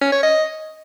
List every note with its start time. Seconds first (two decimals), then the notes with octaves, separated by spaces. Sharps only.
0.01 C#4
0.12 C#5
0.23 D#5